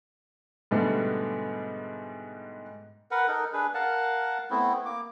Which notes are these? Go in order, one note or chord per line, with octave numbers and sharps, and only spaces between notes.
G#2 B2 D3 G3 A3 B3
A#4 B4 F#5
D#4 A4 A#4
D4 G#4 B4
A#4 F5 F#5 A5
A3 B3 C4 E4
A#3 D6